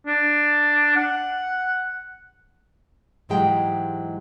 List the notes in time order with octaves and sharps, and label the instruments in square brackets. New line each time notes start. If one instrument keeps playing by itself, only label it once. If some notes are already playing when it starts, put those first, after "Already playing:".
[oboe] D4
F#5
[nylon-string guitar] G#2 E3 F#3 G#3 G4 G5